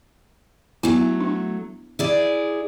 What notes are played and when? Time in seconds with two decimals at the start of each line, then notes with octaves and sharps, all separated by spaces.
0.83 F#3 A3 B3 E4
1.21 D4
1.99 E4 G#4 D5